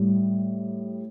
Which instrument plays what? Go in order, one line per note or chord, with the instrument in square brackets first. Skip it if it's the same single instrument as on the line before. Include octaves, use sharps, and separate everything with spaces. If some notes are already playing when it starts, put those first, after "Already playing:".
Already playing: [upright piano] A2 G3